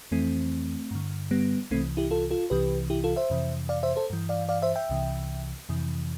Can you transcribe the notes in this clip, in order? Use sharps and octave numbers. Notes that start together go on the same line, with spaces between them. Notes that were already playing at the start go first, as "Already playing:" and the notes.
F2 E3 A3 C4
G2 D3
G3 B3
C2 C3 E3 A3 C4
E4 G4
F4 A4
F4 A4
C2 C3 E3 G4 B4
E4 G4
F4 A4
C5 E5
F2 C3 E3
D5 F5
C5 E5
A4 C5
G2 E3
D5 F5
D5 F5
C5 E5
E5 G5
C2 C3 E3
F2 C3 E3